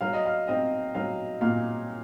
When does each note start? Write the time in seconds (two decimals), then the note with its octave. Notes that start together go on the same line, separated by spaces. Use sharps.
0.01 F#3 F5
0.13 D#5
0.26 F5
0.47 C4 D#5
0.95 F#3 F5
1.41 A#2 F5